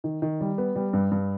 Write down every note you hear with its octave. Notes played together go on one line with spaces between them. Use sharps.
D#3
D#3
G3
B3
G3
G2
G2